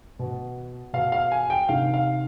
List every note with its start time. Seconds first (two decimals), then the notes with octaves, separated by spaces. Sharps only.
0.19 B2
0.93 B2 F5
1.12 F5
1.32 G#5
1.50 G5
1.69 C3 D#3 F5
1.94 F5